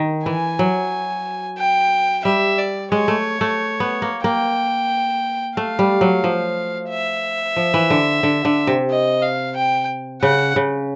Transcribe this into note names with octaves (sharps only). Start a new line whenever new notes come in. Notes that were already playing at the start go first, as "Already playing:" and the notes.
Already playing: D#3
E3 G#5
F#3
G5
G3 E5
D5
G#3 C#5
A3
A3
B3
A#3
A#3 G5
A3 F5
G3
F#3
F3
E5
F3
E3
D3
D3
D3
C3
D#5
F5
G5
C#3 F#5
C#3